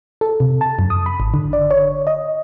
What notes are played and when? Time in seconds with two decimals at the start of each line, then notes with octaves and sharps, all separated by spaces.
0.21 A4
0.40 C3
0.61 A5
0.79 F#2
0.90 D#6
1.06 B5
1.20 G#1
1.34 D3
1.53 D5
1.71 C#5
2.07 D#5